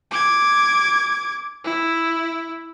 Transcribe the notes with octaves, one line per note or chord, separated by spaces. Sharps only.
D6 G#6
E4